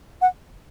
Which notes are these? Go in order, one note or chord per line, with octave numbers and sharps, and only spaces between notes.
F#5